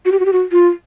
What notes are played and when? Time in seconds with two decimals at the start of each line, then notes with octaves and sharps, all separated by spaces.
0.06 F#4
0.12 G4
0.20 F#4
0.26 G4
0.33 F#4
0.52 F4